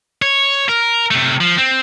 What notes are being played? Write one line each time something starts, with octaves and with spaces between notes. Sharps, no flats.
C#5
A#4
C3 A3
F3
C4